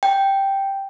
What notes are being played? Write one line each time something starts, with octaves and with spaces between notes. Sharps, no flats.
G5